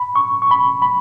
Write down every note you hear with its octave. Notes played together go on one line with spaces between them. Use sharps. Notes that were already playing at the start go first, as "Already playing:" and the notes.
Already playing: B5
C#6
C#6
B5
B5